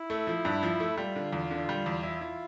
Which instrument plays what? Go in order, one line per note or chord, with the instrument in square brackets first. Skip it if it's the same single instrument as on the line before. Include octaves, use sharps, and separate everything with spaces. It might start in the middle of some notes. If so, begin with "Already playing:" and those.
Already playing: [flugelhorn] E4
[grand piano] A3
F3
G2
F3
A3
[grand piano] G3 [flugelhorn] F4
[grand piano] D3
E2
D3
G3
E2
[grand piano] E4 [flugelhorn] F4
[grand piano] E4